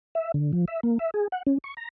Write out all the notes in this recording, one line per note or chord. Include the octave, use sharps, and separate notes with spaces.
E5
D3
F3
E5
A#3
E5
G#4
F#5
C#4
C#6
A#5